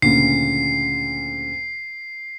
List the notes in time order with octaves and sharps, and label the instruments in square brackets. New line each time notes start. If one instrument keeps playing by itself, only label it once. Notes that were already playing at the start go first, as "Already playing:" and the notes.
[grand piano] D2 A#2 C#3 [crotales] C7